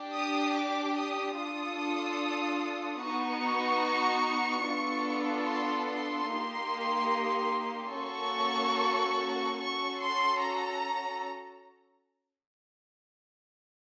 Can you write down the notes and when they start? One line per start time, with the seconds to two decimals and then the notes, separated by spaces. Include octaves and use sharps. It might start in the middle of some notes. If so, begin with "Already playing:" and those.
Already playing: D4 G4
0.14 D#6
0.55 D6
0.96 D#6
1.37 D4 F4 A4 D#6
3.01 B3 D#4 F#4 C#6
4.66 B3 D4 F4 A4
5.48 C6
5.89 C6
6.30 A#3 D#4 G4
7.93 A#3 C#4 F#4 A4 C#6
9.58 C#4 F#4 A4 C#6
9.99 C6
10.40 A#5